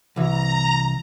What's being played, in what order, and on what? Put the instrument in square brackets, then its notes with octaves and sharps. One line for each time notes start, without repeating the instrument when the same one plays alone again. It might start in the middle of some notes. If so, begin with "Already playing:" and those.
[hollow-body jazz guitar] C2 E3 [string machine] A#5